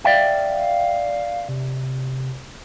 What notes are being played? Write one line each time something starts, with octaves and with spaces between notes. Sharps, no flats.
D5 E5 F5 G5
C3